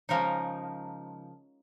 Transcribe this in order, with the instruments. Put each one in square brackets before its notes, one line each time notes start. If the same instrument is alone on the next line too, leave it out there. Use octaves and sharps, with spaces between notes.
[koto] C#3 F3 G#3 D#4 A#4